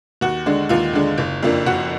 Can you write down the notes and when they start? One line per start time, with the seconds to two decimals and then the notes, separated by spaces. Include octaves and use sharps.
0.21 D#2 F#4
0.46 D3 G#3 D4
0.69 D#2 F4
0.93 D3 G#3 D4
1.18 F#1
1.42 F2 F3 A#3 D4
1.66 F#1 F#4